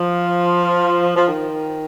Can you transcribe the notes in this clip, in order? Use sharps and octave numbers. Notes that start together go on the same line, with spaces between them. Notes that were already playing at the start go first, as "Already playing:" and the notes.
Already playing: F3
F3
D#3